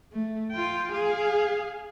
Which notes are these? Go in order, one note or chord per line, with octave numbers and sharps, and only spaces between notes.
A3
F4 G5
G#4 F5